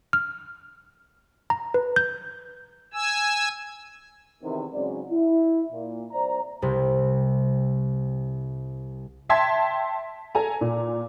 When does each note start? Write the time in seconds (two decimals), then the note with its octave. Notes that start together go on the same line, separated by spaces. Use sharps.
0.13 F6
1.50 A#5
1.74 B4
1.96 G6
2.94 G#5 E6
4.43 E2 C3 D#3
4.74 G#2 C#3 F#3 C4 C#4 D5
5.11 E4
5.72 A#2
6.12 C2 C5 D5 A#5
6.62 C2 C3
9.29 E5 G5 A5 C6 G#6 B6
10.35 A4 G#5 A#5
10.61 A#2